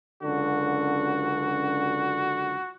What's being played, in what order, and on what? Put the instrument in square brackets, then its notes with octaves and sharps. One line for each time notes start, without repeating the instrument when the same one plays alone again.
[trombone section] C#2 F#2 D3 [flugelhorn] F#4